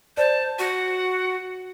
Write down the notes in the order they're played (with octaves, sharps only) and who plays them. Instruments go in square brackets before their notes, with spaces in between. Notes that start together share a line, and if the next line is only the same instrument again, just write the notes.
[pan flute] C5 [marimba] D5 [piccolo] A5
[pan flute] F#4 [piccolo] F#5